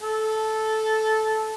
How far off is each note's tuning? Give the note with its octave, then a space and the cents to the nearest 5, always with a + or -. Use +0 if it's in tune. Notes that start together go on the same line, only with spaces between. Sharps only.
A4 -10